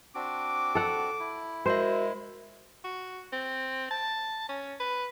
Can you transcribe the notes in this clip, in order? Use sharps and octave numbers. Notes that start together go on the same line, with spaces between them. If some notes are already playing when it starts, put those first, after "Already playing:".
C4 D4 F#4 D6
A4 F#5
E4
G#3 F#4 A#4 C5 E5
F#4
C4
A5
C#4
B4